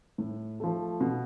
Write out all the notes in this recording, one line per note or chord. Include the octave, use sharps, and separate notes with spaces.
A2
F3 A3
B2